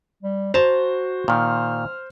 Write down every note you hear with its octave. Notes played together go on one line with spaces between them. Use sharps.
G3
F#4 C5 A5 A#5
A#2 D#3 F6